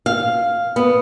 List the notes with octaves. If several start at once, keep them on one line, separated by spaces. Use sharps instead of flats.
F5
B3